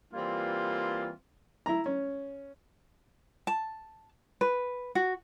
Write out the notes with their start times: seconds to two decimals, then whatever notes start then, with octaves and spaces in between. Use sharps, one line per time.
0.13 E3 G3 A#3 C4 F4
1.66 E4 A#5
1.86 C#4
3.47 A5
4.41 B4
4.95 F#4